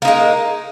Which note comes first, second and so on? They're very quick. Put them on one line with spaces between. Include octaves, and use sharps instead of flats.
A#3 D#4 G#3